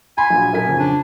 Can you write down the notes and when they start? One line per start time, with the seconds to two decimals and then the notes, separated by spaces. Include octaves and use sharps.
0.18 G#5 B5 C6
0.30 A#1 F#3
0.53 B1 A#4 G#5 B6
0.66 F2 C#3 C#4
0.80 D4